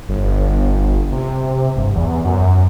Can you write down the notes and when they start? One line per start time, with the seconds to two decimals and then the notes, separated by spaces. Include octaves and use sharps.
0.09 G1
1.12 C3
1.77 G1
1.95 E2
2.25 F#2